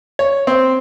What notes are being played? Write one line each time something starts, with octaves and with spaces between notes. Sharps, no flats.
C#5
C4